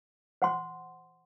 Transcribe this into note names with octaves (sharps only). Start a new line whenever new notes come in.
C5 F#5 C6